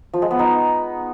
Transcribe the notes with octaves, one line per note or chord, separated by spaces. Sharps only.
F3
G#3
B3
D#4